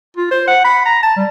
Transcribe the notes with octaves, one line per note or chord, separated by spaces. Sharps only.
F4
C5
F#5
B5
A#5
A5
G3